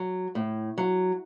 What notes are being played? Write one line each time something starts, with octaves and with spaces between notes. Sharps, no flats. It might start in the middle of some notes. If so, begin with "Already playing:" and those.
Already playing: F#3
A2
F#3